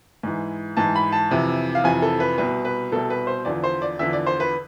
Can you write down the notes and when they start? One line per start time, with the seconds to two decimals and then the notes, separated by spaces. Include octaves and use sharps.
0.23 G#2 E3
0.77 G#2 E3 A5
0.96 B5
1.12 A5
1.31 F2 C3 E3
1.75 F5
1.84 F2 C3 E3 G#5
2.02 A4
2.20 B4
2.38 C2 B2 B4
2.65 B4
2.92 C2 B2 A4
3.10 B4
3.27 C5
3.45 E2 D3 F3 D5
3.64 C5
3.82 D5
3.99 E2 D3 F3 E5
4.13 D5
4.26 C5
4.40 B4